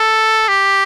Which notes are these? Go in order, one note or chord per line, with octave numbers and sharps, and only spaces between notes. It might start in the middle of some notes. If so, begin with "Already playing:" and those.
Already playing: A4
G4